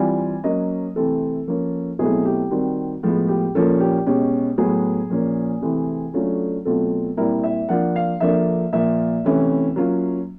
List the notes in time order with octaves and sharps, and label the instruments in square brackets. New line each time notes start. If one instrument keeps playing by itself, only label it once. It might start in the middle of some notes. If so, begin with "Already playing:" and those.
Already playing: [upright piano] E3 G3 C4 F4 G#5
F#3 A#3 C#4 D#5
C3 E3 A3 C4 A4
F3 A#3 C#4
B2 F#3 A3 C4 E4 G#4
G4
D#3 G3 C4 F#4
A2 F3 G#3 B3
G4
A#2 F3 A#3 C#4 F4 A4
G4
B2 G#3 C#4 G4
A2 F#3 B3 G#4
A#2 F3 A#3 C#4
C3 E3 A3 C4
D3 F#3 A3 C#4 F4
B2 F#3 A3 C4 F4 A4
A#2 G3 C4 E4 A#4
E5
F3 A#3 D4 F4 F#5
F5
D3 F3 A#3 D4 E5
A#2 F3 A#3 E5
C3 E3 A3 C#4 E4
F#3 A#3 C#4 F4